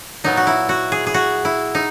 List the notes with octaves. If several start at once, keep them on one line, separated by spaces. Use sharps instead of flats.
A#2 F#3 B3 D#4
F#4
E4
F#4
G#4
G#4
F#4
E4
D#4